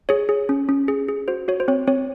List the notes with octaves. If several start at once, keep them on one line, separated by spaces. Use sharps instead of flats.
G#4 C#5
G#4
C#4
C#4
G#4
G#4
F#4 C5
F#4 C#5
C5
C4 C#5
C4 C#5